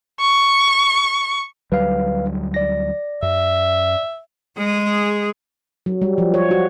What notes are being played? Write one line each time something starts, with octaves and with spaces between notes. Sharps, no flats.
C#6
D2 F#3 G3 B4 F5
D5 A#6
F#2 E5
G#3 G#4
F#3
G3
F3
C#5
F#4